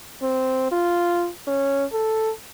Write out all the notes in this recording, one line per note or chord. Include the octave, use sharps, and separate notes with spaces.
C4
F4
C#4
A4